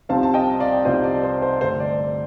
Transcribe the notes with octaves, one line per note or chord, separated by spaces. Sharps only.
C2 C3 F3 C4 D#4 F5 A5
A5
D#5 G5
D5 F5
C2 C3 F3 C4 D#4 C5 D#5
D5
C5
C5
G2 D3 A3 C5
D5